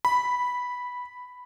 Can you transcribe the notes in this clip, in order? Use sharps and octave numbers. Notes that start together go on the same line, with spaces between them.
B5